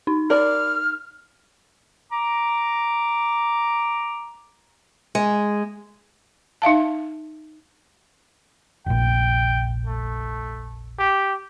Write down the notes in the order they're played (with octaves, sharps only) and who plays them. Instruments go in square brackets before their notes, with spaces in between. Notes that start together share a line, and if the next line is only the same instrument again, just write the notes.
[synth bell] D#4
[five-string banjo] A#4 D5 [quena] F6
[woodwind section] A#5 D6
[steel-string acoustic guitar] G#3
[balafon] D#4 E5 F5 A5
[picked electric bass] F1 A#1 [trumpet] G5
[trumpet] A3
G4